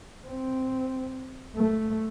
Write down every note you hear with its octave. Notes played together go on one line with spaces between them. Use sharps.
C4
A3